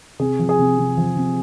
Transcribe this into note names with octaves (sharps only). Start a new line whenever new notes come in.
C3 G#4
F3
G#4
C3
C3
F3
C3